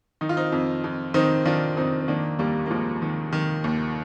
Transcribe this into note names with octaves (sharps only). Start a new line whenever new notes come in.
D#3 D#4
F4
C4 D#4
F2
F2
D#3 C4 D#4
D#3 D4 F4
F2 C4 D#4
C4
D#3 A#3 D4
D#2 G3 A#3
A#3
D#2 F3 G#3
D#3
D#3
D#2